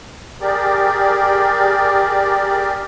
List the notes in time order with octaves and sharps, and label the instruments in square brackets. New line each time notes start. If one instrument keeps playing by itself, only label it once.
[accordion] G4 G#4 A#4 D5